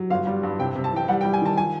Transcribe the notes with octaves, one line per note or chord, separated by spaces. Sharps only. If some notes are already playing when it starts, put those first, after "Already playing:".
Already playing: F#3
G1 F5
G3
G2
C3 G5
C3
A5
E3 G5
G3 F#5
G5
G3
G#5
D#3 A5
F3 G#5